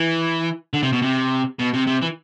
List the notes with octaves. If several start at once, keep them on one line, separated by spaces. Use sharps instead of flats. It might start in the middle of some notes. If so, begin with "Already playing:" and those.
Already playing: E3
D3
C3
B2
C3
B2
C3
C3
E3